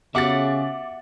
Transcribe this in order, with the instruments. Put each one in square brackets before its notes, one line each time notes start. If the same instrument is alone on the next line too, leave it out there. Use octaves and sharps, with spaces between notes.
[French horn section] C#3 [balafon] B3 F#4 G4 [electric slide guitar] E5 F#5 [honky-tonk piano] D6 A6